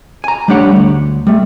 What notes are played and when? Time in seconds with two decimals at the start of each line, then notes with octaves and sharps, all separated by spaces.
0.24 G#5 A#5
0.48 G3 A3 D4 G4 C#5 F#5
0.76 D2
1.27 G3 A3